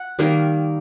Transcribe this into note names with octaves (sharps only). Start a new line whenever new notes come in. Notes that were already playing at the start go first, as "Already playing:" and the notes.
Already playing: F#5
D#3 G3 A#3